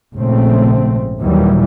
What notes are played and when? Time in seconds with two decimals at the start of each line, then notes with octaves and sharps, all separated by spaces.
0.14 A#1 G#2 C#3 A3 C4
1.20 D#2 A#2 D#3 E3 F#3 G3